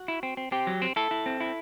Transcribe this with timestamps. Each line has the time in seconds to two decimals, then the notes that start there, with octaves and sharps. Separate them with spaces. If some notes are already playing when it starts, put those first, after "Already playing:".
Already playing: F#4
0.08 E4
0.23 C4
0.37 C4
0.52 C4 G4
0.67 F#3
0.82 C4
0.96 E4 A4
1.11 E4
1.26 C4
1.40 E4